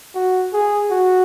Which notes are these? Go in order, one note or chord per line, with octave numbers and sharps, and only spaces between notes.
F#4
G#4
F#4